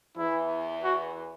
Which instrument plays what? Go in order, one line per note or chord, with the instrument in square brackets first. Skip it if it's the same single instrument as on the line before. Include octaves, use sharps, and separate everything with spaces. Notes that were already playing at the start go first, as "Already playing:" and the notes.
[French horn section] E2 E3 [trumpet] E4
[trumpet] F#4